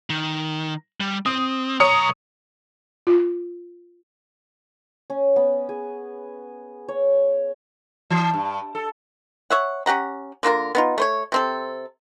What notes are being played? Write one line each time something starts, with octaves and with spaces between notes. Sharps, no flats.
D#3
G3
C4 D#6
B1 C#5 A#5 D#6 C#7
F4
C#4
B3
G#4
C#5
E3
G2
A4
C#5 E5 F#5
C#4 G4 F#5 A#5
D3 A#3 F4 A#4
B3 D#4 F4
A3 C5 C#5
C3 C4 A4